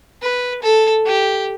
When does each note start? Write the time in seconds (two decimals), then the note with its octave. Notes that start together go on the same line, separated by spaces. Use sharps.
0.22 B4
0.62 A4
1.06 G4